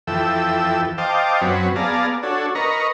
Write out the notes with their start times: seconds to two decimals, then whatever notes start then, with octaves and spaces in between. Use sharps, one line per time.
0.07 F2 E3 A4 G5 E6
0.98 C5 D#5 F5 G5 A5 D6
1.41 F#2 F#3 C4 B4 C#5
1.76 B3 G#4 D5 F5 A5 A#5
2.23 D4 F#4 A4 C#5
2.55 A#4 B4 D#5 A#5 C#6